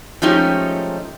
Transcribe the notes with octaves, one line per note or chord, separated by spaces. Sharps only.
F3 G#3 A3 C#4 D#4 G4